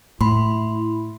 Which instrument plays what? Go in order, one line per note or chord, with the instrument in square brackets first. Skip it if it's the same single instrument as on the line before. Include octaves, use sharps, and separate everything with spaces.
[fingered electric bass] A2 [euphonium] E4 [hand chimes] B5 C6